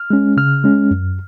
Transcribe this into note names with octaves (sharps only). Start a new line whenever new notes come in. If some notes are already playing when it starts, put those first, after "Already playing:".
Already playing: F6
G#3 C#4
C#3 F6
G#3 C#4
F#2